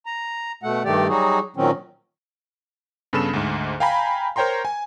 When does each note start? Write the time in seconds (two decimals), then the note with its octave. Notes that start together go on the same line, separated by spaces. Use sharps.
0.06 A#5
0.63 B2 A3 F#5
0.85 G2 D#3 A3 G4 D5
1.08 F#3 G3 D#4 F#4 G#4
1.56 A#2 D#3 F#3 C4 C#4
3.13 G2 C#3 B3 A4 B5 E7
3.33 D2 G#2
3.80 F5 G5 G#5 A#5 B5
4.36 A#4 C5 C#5 G5 A#5 C6
4.65 G#5